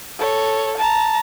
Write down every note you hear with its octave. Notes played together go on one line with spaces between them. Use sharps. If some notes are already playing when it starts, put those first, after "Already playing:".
A4 C#5
A5 A#5